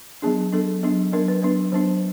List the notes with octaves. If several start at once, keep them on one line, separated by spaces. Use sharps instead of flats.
F#3 B3 D4 G#4
F#3 B3 D4 A4
F#3 B3 D4
F#3 B3 D4 A#4
B4
F#3 B3 D4 B4
F#3 B3 D4 C5